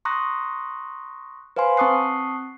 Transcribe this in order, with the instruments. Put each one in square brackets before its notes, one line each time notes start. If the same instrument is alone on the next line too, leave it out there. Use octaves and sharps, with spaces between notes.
[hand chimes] A#5 C6 C#6 D#6 F#6 A#6
B4 C5 F5 G#5 C6
C4 A5 C#6 D#6 F#6 C7